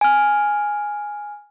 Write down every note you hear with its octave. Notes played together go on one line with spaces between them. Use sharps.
G#5 F6